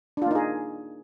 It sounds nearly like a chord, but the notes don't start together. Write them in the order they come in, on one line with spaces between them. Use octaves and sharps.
D4 F4 A#3 D#4 G#4